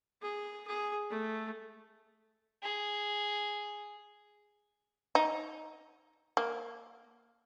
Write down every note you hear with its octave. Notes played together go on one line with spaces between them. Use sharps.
G#4
G#4
A3
G#4
D#4
A#3